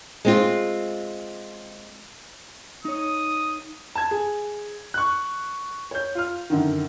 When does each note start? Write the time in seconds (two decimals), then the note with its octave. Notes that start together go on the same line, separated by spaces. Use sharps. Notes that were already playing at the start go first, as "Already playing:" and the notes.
0.25 G#3 C4 F4
2.85 D#4 C#5 D#6
3.95 A5 G#6
4.11 G#4
4.94 C#6 F#6
5.91 C#5 G6
6.15 F4 F6
6.50 F#2 D3 D#3